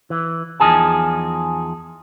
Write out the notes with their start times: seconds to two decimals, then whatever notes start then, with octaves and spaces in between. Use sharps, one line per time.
0.10 E3
0.60 E2 F3 D#4 G#4 A5